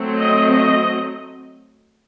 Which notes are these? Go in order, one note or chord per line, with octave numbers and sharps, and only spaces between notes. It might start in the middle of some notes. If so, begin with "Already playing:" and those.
Already playing: F#3 A3 C4
D#5
D#5